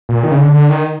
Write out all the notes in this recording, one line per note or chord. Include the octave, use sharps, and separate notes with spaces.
A#2
D#3
C#3
D3
D3
D#3